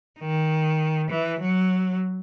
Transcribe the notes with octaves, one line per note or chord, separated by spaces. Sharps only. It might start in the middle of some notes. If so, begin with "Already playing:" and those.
D#3
E3
F#3